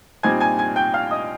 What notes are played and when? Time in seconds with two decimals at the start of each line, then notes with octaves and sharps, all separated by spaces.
0.23 A#2 G3 C4 D#4 G#5 G#6
0.40 G#5 G#6
0.58 G#5 G#6
0.76 G5 G6
0.94 F5 F6
1.11 D#5 D#6